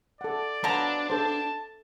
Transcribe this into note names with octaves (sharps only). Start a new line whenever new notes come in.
A4 D5 F#5
B2 F3 F#3 D4 A#5
A4 C5 A5